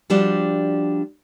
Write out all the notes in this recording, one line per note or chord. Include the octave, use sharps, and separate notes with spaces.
F3 G3 D4 F#4 G4